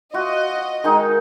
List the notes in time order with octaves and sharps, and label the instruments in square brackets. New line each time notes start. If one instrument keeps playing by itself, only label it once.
[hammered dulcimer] F4 F#4 [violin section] D#5
[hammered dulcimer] D#3 G#3 D#4